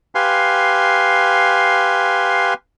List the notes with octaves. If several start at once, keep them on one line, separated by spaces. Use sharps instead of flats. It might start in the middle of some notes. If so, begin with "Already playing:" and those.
G4 B4 F5 G#5 C6